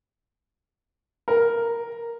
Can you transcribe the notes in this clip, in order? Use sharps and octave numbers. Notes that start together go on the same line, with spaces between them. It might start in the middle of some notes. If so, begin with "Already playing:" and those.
A#4